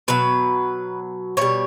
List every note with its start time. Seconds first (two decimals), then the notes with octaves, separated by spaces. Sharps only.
0.08 B2 F#3 B4
1.37 B2 G3 C#5